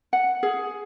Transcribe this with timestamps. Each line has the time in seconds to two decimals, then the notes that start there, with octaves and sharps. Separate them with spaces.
0.13 F#5
0.43 G#4